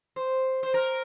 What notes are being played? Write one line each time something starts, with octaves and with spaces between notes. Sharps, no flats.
C5
C5
A#4